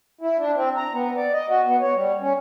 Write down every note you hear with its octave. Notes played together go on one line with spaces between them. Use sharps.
E4
D4
C4
A#5
B3
D5
D#5
F#4
B3
C#5
G3
C#4